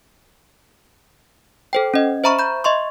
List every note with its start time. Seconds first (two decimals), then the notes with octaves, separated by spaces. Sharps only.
1.73 A4 C5 G5
1.94 C#4 D#5
2.24 C5 E5 A#5 B5 C#6
2.39 B5 G6
2.64 D#5 E5 C6 C#6